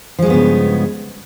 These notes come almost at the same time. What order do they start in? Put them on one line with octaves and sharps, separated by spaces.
F3 G#3 G2 B3 C#3